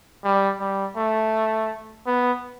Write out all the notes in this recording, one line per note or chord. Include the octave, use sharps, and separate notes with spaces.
G3
G3
A3
B3